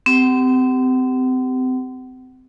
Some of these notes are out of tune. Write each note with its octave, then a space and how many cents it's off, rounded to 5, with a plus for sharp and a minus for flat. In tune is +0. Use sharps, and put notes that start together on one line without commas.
C4 -30 G4 +0 F#5 +30